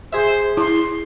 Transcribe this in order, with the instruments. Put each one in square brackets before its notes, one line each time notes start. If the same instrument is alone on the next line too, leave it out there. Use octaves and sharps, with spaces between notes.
[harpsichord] G#4 E5 [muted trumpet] C5
[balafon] E4 [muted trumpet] C6